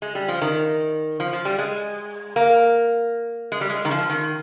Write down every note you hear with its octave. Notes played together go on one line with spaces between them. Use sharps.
G#3
G3
F3
D#3
F3
F3
G3
G#3
A#3
G#3
G3
G#3
D#3
F3
D#3